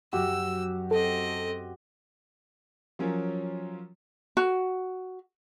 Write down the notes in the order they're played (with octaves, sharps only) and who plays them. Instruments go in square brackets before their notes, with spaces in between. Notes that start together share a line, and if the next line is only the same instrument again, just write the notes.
[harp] F#2 F#3 [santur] F#4 G4 [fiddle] E6
[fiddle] C4 D#5 [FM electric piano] A4
[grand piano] F3 F#3 C#4 F4 A#4 C#5
[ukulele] F#4